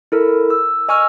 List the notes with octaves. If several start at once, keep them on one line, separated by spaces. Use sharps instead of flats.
E4 A4 A#4
E6
D#5 G#5 C#6 E6 F6